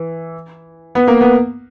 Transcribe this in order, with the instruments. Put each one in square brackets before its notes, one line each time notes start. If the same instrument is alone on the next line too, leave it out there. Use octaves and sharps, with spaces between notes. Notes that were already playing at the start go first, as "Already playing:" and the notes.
Already playing: [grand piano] E3
B3
A#3
B3